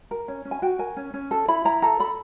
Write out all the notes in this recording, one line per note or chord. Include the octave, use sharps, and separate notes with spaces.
A#4
C#4
C#4
G#5
F#4 G5
A#4 G#5
C#4
C#4
A4
E4 B5
E4 A#5
A4 A#5
A4 B5